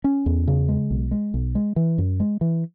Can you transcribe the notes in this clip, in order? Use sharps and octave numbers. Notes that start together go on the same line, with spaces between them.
C#4
E2
C#3
G#3
B1
G#3
B1
G#3
E3
F#2
G#3
E3